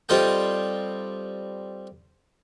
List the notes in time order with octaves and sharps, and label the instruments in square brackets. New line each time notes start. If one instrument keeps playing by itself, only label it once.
[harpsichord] G3 C4 F4 A4 D#5 G5